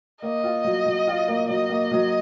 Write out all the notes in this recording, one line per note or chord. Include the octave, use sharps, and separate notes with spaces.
A#3 D#5
F4
F#3
F#3
F4
A#3
F#3 D#5
A#3
F#3